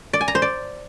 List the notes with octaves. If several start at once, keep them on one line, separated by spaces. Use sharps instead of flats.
D5
G#5
A#5
C5
D5